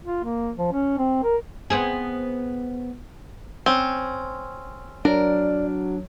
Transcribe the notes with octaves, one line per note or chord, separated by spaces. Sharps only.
F4
A#3
F3
C#4
C4
A#4
B3 C4 G#4
C4 C#4
F#3 D4 A#4 D5